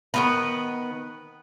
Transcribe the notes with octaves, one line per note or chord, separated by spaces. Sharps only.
D#3 B3 B4